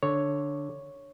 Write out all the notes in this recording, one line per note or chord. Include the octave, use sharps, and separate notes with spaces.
D3 C#5